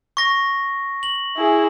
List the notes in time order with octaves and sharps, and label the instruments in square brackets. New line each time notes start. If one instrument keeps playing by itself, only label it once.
[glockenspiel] C#6 A#6
F#7
[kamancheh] E4 G#4